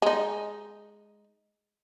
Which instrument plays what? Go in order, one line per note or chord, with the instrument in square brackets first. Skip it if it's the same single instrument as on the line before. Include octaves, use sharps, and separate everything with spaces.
[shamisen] G#3 D#4